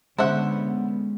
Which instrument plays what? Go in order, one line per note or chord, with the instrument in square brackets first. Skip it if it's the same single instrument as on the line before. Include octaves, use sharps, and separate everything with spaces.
[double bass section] D3 B3 [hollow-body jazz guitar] G#3 C#4 [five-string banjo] C5 E5 F#5